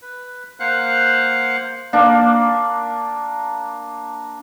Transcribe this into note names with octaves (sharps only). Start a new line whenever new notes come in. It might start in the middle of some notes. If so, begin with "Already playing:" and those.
B4
A#3 C5 F5 F#5 F#6
A#3 D4